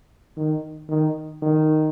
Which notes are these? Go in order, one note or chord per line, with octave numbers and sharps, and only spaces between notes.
D#3
D#3
D#3